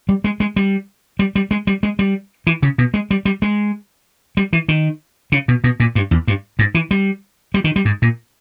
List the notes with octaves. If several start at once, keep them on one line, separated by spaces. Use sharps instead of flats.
G3
G#3
G#3
G3
G3
G3
G#3
G3
G#3
G3
E3
C#3
B2
G#3
G3
G3
G#3
G3
E3
D#3
C#3
B2
B2
A#2
G2
E2
G2
G#2
E3
G3
G3
D#3
G3
G#2
A#2